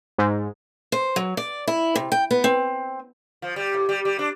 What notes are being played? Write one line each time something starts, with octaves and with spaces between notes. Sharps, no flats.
G#2
C5
F#3
D5
E4
C3
G5
B3
C4
F3
G3
A2
G3
G3
D4